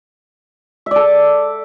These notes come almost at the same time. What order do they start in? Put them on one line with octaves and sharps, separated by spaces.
E5 D5 A4